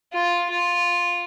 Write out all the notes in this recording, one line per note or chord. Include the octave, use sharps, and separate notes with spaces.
F4
F4